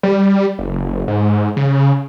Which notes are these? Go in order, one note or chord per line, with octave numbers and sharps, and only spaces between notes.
G3
F#1
G#2
C#3